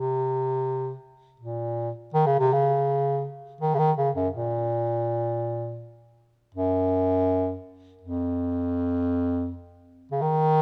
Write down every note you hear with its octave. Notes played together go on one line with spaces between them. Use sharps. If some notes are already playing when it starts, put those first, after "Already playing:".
Already playing: C3
A#2
D#3
C#3
C3
C#3
D#3
C#3
D#3
C#3
F#2
A#2
F#2
F2
C#3
D#3